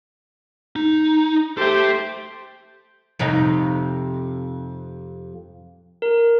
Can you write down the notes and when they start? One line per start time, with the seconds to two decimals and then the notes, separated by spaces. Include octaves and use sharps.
0.76 D#4
1.57 G4 A4 C5 E5
3.19 F2 C3 D#4
6.02 A#4